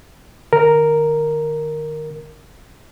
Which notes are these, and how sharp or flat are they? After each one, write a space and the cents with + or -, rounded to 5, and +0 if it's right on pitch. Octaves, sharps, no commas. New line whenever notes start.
D#3 -35 A#4 +0